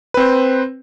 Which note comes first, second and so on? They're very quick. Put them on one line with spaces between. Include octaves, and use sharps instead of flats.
B4 C4 C5